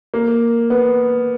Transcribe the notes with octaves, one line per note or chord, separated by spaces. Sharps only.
A#3
B3